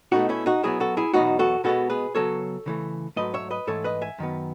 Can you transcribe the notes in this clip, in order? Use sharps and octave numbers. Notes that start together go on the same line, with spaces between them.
B2 A3 D#4 F#4
C#4 E4
D#4 F#4
B2 F#3 B3 E4 G#4
F#4 A4
E4 G#4
E2 B2 F#3 D#4 F#4
F#4 A4
B2 G#3 B3 F#4 A4
G#4 B4
C#3 F#3 B3 A4 C#5
C#3 E3 A3
G#2 F#3 A3 B4 D#5
C#5 E5
B4 D#5
G#2 E3 A3 A4 C#5
B4 D#5
E5 G#5
F#2 D#3 B3